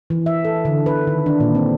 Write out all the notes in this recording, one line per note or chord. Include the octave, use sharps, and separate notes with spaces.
E3
E5
A4
D3
B4
D#3
D4
A#2
C4